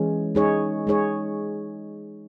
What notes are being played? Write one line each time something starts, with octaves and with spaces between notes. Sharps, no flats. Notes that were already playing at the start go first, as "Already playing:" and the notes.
Already playing: E3 G#3 C#4
G#3 D#4 G#4 C#5
G#3 D#4 G#4 C#5